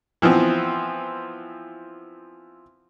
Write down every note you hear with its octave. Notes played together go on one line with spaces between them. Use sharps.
E3 F3 B3 C4